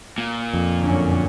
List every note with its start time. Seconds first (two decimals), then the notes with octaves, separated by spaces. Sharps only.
0.18 A#2
0.54 F2
0.82 F#2 D3 C#4